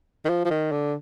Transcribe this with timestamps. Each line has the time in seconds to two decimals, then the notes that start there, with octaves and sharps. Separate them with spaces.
0.25 D#3
0.29 F3
0.45 F3
0.51 D#3
0.72 D3